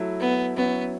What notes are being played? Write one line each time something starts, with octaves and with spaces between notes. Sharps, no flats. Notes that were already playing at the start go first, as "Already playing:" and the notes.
Already playing: F#3 A3 E4
B3
F#3 B3 C#4 E4